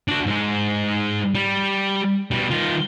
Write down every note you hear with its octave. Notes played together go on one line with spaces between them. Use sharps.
D4 F#4
G#2 G#3
G3
B2 G3
D#3 F4